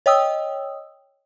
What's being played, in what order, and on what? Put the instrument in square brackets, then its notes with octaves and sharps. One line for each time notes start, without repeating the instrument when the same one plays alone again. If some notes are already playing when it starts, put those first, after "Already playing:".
[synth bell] C#5 D#5 G5 D#6 E6